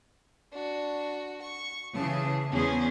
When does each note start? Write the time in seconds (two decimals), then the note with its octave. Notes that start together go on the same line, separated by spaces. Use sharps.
0.52 D4 F#4
1.42 C#6
1.95 C#3 E3 G#4 A5
2.52 E2 B3 C#4 G#4 C5